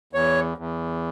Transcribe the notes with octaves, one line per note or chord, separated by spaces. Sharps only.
E2 C#5
E2